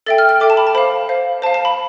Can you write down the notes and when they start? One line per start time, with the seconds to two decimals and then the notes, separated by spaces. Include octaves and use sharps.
0.06 A4 E5 G5 A6
0.18 F6
0.29 F6
0.40 A4 E5 G5 D6
0.50 A5
0.57 B5
0.67 A5
0.75 C5 F5 B5
1.09 C5 F5
1.42 C5 A5
1.46 F5
1.54 A5
1.65 B5